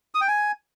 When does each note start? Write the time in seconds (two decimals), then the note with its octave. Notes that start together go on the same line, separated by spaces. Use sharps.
0.15 D#6
0.21 G5
0.28 G#5